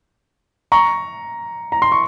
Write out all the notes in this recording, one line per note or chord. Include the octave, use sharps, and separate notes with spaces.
A#5 C#6
A#5
C6
C#6